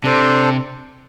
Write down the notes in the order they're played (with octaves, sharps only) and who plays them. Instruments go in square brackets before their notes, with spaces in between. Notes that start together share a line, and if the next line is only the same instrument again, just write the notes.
[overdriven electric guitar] C3 [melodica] D4 A4 C5